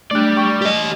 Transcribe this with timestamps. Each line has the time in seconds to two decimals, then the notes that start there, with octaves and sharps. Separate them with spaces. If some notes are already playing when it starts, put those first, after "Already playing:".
0.11 G3 A3 D4 D5 F#6
0.36 D4 G5 C#6
0.62 G4 D#5